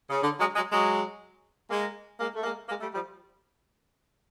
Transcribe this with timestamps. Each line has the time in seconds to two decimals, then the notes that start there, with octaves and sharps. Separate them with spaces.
0.10 C#3
0.22 D3
0.39 F#3 G#3
0.55 F#3 G#3
0.71 F#3 G#3
1.70 G#3 A#3
2.19 G#3 A#3
2.35 A3
2.43 G#3 A#3
2.68 G#3 A#3
2.80 G3 A3
2.92 F3 G3